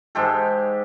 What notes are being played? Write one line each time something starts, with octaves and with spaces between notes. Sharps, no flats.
G#2 G#3 G4 A4